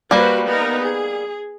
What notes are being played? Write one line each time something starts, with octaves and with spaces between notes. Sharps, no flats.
G3 A#3 F#4 B4 C5
B3 D#4 A#4
G#4